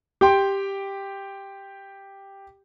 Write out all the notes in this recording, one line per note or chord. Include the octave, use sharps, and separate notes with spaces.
G4 G5 C6